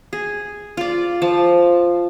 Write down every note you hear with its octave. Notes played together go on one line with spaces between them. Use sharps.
G#4
F4 D5
F3 A5